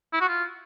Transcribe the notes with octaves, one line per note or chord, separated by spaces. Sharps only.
E4
F#4
F4